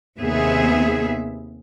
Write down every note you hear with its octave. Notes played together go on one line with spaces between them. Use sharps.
D#2 C3 B3 G#4 E5